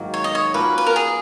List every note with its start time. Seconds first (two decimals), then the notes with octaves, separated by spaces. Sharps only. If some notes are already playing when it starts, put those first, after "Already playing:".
Already playing: G#2 D#3 F#3 A#3
0.14 C#5
0.24 D#5
0.35 C#5
0.54 F3 A#3 C#4 F#4 B4
0.78 B4
0.86 A#4
0.96 G#4